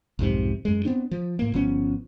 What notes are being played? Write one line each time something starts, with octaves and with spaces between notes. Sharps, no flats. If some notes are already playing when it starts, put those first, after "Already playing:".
B1 F2 G#2 C3
F#2 G#3
B3 C4 D4
F3
A2 A#3
G1 F3 B3 C#4